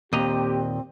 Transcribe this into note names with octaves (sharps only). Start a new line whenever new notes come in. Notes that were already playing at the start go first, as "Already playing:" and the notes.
D#2 A#2 C4 G4 D#5 A#5